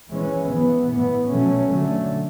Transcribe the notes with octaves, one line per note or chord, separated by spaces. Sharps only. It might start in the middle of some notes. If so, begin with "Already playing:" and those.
E3 G#3 C#4
E3 B3
A2 E3 B3
B2 F#3 A3 C#4
D3 F#3 A3